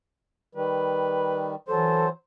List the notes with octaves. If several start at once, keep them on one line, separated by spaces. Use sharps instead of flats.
D#3 G3 B4
E3 F#3 A4 C5